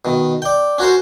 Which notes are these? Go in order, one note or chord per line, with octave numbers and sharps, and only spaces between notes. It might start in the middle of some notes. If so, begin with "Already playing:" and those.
B2 D#3
D5 G5
C#4 F#4 A#4 C5